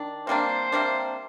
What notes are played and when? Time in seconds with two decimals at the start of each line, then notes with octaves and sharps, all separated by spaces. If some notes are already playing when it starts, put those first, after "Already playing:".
Already playing: D#3 D4
0.27 C3 G3 A#3 D4 C5
0.72 C3 G3 A#3 D4